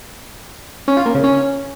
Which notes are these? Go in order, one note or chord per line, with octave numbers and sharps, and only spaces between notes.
C#4
F4
A#3
C#3
C#4